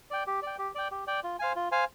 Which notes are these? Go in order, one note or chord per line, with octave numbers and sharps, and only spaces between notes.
D5 G5
G4
D5 G5
G4
D5 G5
G4
D5 G5
F4
C5 F5 G#5
F4
C5 F5 G#5